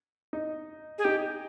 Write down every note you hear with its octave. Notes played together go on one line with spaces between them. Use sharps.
D#4
G#4
D#4 G4